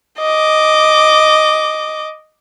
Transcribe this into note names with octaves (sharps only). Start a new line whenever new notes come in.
D#5 D6